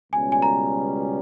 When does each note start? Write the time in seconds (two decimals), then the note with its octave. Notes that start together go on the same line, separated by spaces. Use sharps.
0.13 C#2 B2 G3 C#4 G#5
0.32 G#5
0.42 A#5